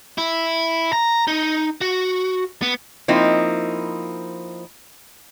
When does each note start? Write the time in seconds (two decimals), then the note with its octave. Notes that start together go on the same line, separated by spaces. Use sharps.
0.18 E4
0.93 A#5
1.27 D#4
1.81 F#4
2.62 B3
3.08 F3 A#3 C4 D#4 E4